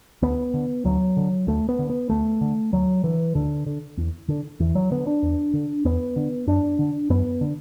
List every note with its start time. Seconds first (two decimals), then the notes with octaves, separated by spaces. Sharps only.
0.22 D2 B3
0.54 D3
0.85 D2 F#3
1.17 D3
1.47 D2 A3
1.69 B3
1.79 D3
1.90 B3
2.10 D2 A3
2.41 D3
2.72 D2 F#3
3.03 D3 E3
3.35 D2 D3
3.66 D3
3.97 E2
4.28 D3
4.60 E2 E3
4.75 F#3
4.91 D3 B3
5.07 D4
5.22 E2
5.54 D3
5.85 E2 B3
6.16 D3
6.47 F#2 D4
6.79 D3
7.10 F#2 B3
7.41 D3